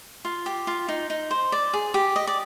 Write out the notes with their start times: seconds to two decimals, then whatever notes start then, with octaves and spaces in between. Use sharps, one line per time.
0.25 F4
0.46 G4
0.67 F4
0.88 D#4
1.10 D#4
1.31 C5
1.52 D5
1.73 G#4
1.94 G4
2.16 D#5
2.27 D5